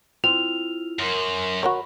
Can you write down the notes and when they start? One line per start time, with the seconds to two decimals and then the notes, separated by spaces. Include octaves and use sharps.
0.24 C4 E4 F4 F7
0.99 F#2 A#4 C6
1.63 F#4 A#4 C#5 B5